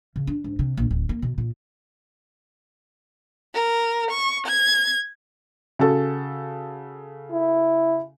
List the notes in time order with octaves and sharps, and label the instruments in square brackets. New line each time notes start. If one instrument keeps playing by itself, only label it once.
[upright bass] C#3
D4
G#2
C3
A#1
D1
A#3
B2
A#2
[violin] A#4
C#6
G#6
[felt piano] C#3 F#4 A4
[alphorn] E4